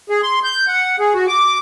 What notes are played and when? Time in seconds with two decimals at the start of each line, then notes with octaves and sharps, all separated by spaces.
0.10 G#4
0.23 C6
0.44 G6
0.68 F#5
0.99 G#4
1.14 F#4
1.27 D6